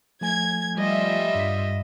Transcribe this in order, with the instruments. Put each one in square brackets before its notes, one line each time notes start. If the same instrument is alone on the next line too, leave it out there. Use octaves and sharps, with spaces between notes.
[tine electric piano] F3 A3 G#5 [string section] G#6
[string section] G3 F4 E5 [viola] D#5
[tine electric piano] G2 B6